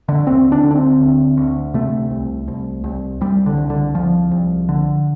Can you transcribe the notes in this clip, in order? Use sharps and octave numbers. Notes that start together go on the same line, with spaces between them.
D3
D2 C4
D4
D3
D4
C4
D2
D2
C3 A3
C2
C2
C2
C2 G3
D3
C2
D3
C2 F3
C2
D3